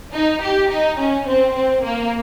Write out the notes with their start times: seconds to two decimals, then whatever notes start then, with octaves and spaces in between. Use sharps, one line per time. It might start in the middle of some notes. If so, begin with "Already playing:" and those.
0.13 D#4
0.41 G4
0.70 D#4
0.98 C#4
1.26 C4
1.54 C4
1.82 A#3